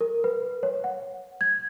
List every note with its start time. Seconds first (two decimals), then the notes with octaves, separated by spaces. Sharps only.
0.01 A#4
0.24 B4
0.63 C#5
0.84 F#5
1.41 G#6